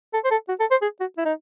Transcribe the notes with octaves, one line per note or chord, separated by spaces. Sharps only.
A4
C5
A4
F#4
A4
C5
G#4
F#4
E4
D#4